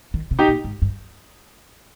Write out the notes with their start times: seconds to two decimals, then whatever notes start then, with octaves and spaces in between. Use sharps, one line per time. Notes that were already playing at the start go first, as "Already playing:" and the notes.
0.14 D#3
0.31 C3
0.39 D#4 G4
0.48 A#2
0.64 G#2
0.82 G2